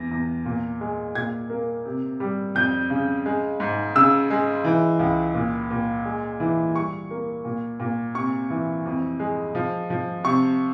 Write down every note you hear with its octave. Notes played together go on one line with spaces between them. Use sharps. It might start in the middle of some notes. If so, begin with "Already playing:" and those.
Already playing: E2 A#6
E2
A#2
G#3
A#2 G#6
A#3
C3
G3
F2 G6
C#3
G#3
G#2
C#3 E6
G#3
E3
C#2
A#2
A#2
G#3
E3
G3 C#6
A#3
A#2
A#2
C3 C#6
E3
F2
G#3
F3
F3
C3 C#6